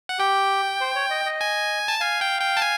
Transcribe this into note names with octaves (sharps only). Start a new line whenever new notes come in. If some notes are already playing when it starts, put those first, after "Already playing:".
F#5
G4 G5
C5
C#5
D#5
D#5
G#5
A5
F5 G#5
G5
G5
A5
G#5